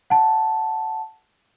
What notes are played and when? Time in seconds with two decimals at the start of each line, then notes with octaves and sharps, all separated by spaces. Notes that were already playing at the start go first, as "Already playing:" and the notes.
0.10 F#5 A5